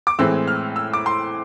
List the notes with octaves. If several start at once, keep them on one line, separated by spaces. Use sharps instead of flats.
D6
A2 E3 G#3 C4 E6
F6
E6
D6
C6